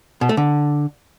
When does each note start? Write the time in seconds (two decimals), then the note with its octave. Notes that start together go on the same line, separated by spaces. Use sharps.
0.21 B2
0.29 A3
0.37 D3